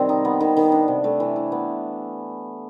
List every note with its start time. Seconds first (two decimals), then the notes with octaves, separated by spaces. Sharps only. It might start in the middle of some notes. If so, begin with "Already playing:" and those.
Already playing: C3 D#3 G3 C4
0.09 D#4
0.25 B3
0.41 D#3
0.57 D#3
0.72 D4
0.88 C3
1.04 A3
1.20 E3
1.36 E4
1.52 B3